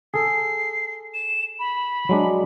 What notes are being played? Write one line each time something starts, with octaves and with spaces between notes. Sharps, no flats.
G#4 A4 C7
E7
B5
F#3 G#3 D4